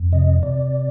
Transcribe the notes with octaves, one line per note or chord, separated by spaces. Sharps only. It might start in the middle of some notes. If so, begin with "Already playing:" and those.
Already playing: F2
C3 D#5
C3 D5